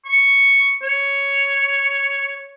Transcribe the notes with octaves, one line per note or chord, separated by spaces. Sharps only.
C#6
C#5